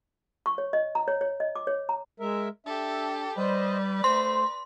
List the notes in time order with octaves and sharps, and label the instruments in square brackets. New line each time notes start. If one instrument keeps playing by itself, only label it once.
[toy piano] C#6
C#5
D#5
A#5
C#5
C#5
D#5
D6
C#5
A#5
[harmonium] G#3 A#4 E5
[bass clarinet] D4 [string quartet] G4 A4 [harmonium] E5
[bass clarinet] G3 [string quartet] B4 D5 [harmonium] C5 D#5
[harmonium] A3 [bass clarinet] C5 [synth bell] C6